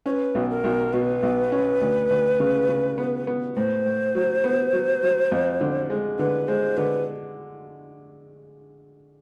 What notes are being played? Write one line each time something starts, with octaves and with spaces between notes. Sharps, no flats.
C#4 B4 C5
B1
A#4
B1
B2 B4
B1
C#4
D2
D2
C#3
C#3
B3
B3
A2 C5
A2
F#3
B3
F#3
F#3
F2
D3
G#3
D3 B4
G#3 C5
D3 B4